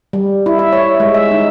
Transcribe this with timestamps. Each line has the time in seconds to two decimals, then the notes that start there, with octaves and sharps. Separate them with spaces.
0.13 G3
0.46 E4
0.59 E5
0.73 C#5
1.00 G#3
1.14 E5
1.31 D#4